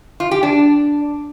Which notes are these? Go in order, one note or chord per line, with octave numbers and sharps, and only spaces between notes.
F4
G4
D4